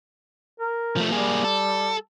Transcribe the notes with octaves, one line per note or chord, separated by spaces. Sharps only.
A#4
F3 A3
G3 A#3 G#4
A4